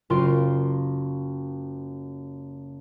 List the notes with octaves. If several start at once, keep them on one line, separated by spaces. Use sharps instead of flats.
F#1 F4 C6 D7